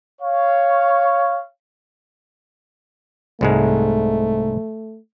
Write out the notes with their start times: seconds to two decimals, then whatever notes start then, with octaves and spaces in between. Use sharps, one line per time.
0.21 C#5 F5
3.41 C2 G#2 G#3 A3